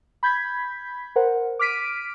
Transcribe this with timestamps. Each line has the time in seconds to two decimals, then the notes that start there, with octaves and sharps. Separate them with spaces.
0.23 B5 G6 G#6 B6
1.16 A#4 C5 F#5
1.59 D6 F6 B6 D7 D#7